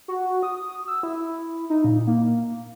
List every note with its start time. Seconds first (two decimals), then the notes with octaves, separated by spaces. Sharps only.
0.08 F#4
0.43 D#6
0.87 E6
1.03 E4
1.70 D#4
1.84 A#2
2.07 A#3